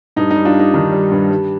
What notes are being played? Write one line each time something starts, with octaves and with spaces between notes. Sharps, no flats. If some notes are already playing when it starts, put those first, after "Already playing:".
G2 D#4
D#4
G3
D4 F4
G3
D#4
D#3 D4
G3
G2
G3